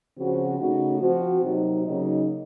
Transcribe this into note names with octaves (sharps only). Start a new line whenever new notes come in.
C#3 F3 C4 F#4
C#3 A3 D#4 F#4
F3 C4 F#4
C3 F#3 A#3 D#4
C#3 F#3 A#3 D#4